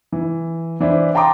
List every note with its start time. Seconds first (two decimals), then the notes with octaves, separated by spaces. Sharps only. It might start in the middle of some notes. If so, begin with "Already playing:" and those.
0.12 E3
0.80 E3 D4 E4 C5
1.15 G5 A5 A#5 C6 D6 D#6